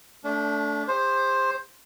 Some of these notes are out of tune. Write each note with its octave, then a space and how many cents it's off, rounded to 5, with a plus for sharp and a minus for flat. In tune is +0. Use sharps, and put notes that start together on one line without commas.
A3 +0 D4 -25
G4 +40 C5 +10